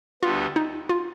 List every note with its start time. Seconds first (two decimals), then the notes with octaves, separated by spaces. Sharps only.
0.23 D2 D3 G3 B3 F4
0.56 D#4
0.89 F4